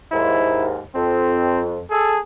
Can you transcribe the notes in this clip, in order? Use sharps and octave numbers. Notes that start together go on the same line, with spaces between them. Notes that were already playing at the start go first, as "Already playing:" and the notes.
D#2 G#2 E4
F2 C4
G#4 A4